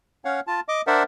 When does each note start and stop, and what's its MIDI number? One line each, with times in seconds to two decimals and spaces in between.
0.25 0.40 61
0.25 0.40 73
0.25 0.40 77
0.25 0.40 78
0.47 0.60 65
0.47 0.60 81
0.68 0.82 75
0.68 0.82 86
0.87 1.03 62
0.87 1.03 70
0.87 1.03 72
0.87 1.03 74
0.87 1.03 76
0.87 1.03 78